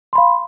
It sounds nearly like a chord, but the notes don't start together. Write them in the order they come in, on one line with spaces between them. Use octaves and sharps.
C6 B5 F5